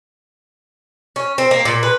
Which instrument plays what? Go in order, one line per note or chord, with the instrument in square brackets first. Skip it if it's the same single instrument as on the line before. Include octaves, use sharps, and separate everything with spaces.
[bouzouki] C#4
C4
A#3
A#2
B4